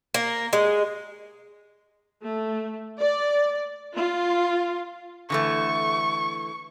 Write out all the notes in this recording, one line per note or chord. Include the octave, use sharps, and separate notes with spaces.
A#3
G#3
A3
D5
F4
D3 E3 A3 C#6